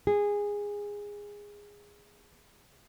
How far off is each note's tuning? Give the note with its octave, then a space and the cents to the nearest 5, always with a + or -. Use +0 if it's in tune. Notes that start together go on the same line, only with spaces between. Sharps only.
G#4 -15